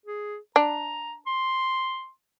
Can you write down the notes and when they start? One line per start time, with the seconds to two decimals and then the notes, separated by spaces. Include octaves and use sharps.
0.06 G#4
0.56 D4 A#5
1.26 C6